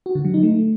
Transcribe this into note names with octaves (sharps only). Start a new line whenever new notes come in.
F#4
D3
F#3
D#4
A3